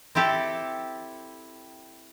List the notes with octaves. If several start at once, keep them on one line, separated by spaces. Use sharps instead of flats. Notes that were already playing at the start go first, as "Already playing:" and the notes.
C4 E4 G4 A4